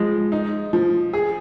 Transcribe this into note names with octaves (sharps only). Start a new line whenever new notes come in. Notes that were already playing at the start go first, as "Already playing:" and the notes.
Already playing: F3 G#3
D#4
F3
G#4